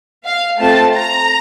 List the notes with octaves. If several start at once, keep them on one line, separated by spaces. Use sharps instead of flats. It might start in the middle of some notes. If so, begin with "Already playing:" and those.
F5
A3 C4 F4 A5
A#5